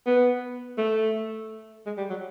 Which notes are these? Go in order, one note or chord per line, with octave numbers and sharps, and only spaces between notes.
B3
A3
G#3
G3
F#3